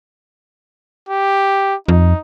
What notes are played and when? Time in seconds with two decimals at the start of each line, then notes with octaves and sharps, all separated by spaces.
1.09 G4
1.88 F2 D#4